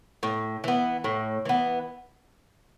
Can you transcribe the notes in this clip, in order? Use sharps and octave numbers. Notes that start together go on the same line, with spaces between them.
A2
E3 B3
A2
E3 B3